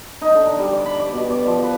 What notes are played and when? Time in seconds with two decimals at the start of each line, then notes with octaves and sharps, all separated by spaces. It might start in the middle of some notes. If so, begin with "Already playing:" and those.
0.22 D#4
0.35 D3
0.47 A#5
0.59 G3
0.73 D5
0.86 B5
0.99 D5
1.13 B2
1.30 D5
1.47 F3
1.64 B4